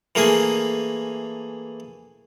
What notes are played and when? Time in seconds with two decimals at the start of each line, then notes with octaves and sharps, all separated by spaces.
0.15 E3 A3 A#3 G#4